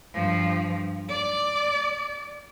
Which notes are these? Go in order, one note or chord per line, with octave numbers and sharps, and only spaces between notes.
G2 F3
D5